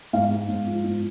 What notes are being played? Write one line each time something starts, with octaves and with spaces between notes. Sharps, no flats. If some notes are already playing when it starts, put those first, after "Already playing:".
G#2 F5
G#3
G#2
F3
G#2